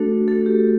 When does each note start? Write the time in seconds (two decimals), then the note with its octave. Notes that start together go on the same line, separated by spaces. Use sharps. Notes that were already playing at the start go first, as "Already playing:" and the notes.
Already playing: A3 D4 F#4 A4
0.28 A3 D4 F#4 A4
0.46 G4